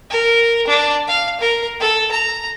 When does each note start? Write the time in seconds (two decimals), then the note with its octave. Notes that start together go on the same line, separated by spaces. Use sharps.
0.10 A#4
0.67 D4
1.08 F5
1.41 A#4
1.80 A4
2.11 A#5